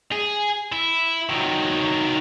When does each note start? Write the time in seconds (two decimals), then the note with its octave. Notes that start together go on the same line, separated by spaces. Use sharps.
0.12 G#4
0.72 E4
1.29 D#3 F#3